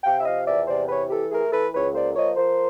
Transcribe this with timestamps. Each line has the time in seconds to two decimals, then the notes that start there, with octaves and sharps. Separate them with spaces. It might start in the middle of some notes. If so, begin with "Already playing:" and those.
0.04 C3 F5 G5
0.20 E5
0.25 F3 D#5 F5
0.46 E2 D5 E5
0.67 C3 C5 D5
0.89 E3 B4 C#5
1.10 E3 G4 A4
1.31 A3 G#4 A#4
1.52 E3 A4 B4
1.74 C#2 B4 C#5
1.94 A#3 C5 D5
2.15 F3 C#5 D#5
2.37 F3 A#4 C5